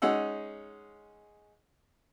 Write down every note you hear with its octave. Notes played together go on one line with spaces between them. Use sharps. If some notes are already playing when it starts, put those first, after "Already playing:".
G#3 C#4 D#4 F#5 E6